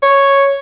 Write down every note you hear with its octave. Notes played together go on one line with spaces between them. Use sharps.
C#5